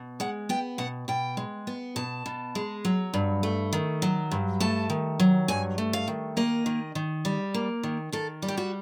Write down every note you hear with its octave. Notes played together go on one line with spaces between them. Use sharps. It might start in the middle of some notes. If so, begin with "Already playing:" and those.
Already playing: B2
G#3 F#5
B3 G5
B2 F#5
B2 G5
G#3
B3
B2 A5
B2
G#3
F#3
G2
A3
D#3
F#3
G2
A3 A5
D#3
F#3
G2 G#5
A3
F5
D#3
A#3 D#5
D#3
D#3
G3
A#3
D#3
D#3 A4
G3
G4
F#4